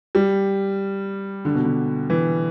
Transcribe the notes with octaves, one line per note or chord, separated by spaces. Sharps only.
G3
D3
B2
D3
E3